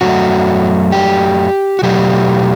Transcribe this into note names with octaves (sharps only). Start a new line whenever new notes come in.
F#2 F#3 A3 F#4
G4
F#4
B2 F#3 A3 G4